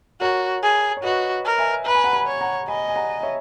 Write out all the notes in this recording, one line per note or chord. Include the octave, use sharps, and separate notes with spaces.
F#4 A#4 C#5
G#4
C#5
F#4 B4 D#5
A#4
E5 G#5
B4 A#5
G#5
F#5 A#5
G#5 B5
C#5
F#5 A#5
D#5 G#5 B5
G#5
F#5 A#5
C#5 E5